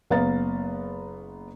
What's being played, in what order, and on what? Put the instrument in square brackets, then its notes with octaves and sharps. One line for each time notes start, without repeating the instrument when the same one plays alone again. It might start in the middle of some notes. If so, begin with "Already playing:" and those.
[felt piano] F#1 B3 F5 A#5 A6